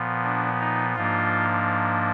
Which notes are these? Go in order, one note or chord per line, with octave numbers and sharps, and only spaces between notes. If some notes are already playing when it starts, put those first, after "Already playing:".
Already playing: A#2 F3 B3
D4
D#4
G#2 F3 A#3 D4 F4